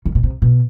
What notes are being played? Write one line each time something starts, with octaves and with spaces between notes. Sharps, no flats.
D#3
B2
C3
B2